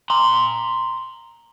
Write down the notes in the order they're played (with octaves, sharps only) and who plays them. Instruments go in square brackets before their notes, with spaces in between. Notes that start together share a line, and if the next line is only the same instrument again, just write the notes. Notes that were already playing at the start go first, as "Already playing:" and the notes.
[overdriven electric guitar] A#5 C6